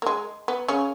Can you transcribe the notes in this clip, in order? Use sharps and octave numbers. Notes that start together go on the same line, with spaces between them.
A#3
G#3
B3
C#3 C#4